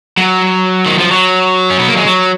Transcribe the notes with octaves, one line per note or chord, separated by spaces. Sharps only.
F#3
D#3
F3
F#3
C#4
B3
A#3
G#3
F#3